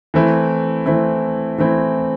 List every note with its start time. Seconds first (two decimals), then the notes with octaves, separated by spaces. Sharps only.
0.14 E3 A3 C4 E4
0.86 E3 A3 C4 E4
1.58 E3 A3 C4 E4